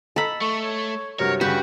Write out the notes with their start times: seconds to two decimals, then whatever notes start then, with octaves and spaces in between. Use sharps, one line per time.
0.16 A4 D#5 A#5 B5 E6
0.41 A3 C#6
0.64 C#5
1.19 G2 C3 F#3 A#4 C#5
1.41 G2 C#3 F#4 G4 B4